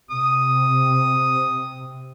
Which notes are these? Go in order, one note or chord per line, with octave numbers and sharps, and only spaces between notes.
C3 D#6